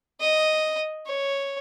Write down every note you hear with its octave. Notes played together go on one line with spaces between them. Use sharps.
D#5
C#5